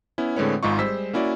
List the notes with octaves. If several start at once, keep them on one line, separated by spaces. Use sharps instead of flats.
B3 C#4 E4
A2 D3 G#3 C4 B4 C#5
G#1 G#2 G#3 D#4 F4 C#6
G3 G#3 C5 E6 B6
A#3 C#4 E4 F#4 D5